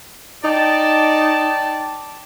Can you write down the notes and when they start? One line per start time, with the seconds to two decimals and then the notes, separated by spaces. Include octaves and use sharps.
0.44 D#4 D5 G5 A5